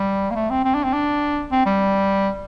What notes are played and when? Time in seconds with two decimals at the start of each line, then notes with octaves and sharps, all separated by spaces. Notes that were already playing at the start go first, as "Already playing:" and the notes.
Already playing: G3
0.31 A#3
0.35 A3
0.50 C4
0.65 C4
0.75 D4
0.84 C4
0.93 D4
1.51 C4
1.66 G3